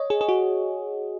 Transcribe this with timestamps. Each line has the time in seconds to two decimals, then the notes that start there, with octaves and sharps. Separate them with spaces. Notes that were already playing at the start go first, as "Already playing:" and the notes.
Already playing: C#5 D#5
0.10 G#4
0.21 G#4
0.29 F#4